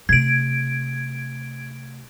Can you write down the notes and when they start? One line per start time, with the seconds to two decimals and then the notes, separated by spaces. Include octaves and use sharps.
0.09 C3 A3 G#6 D7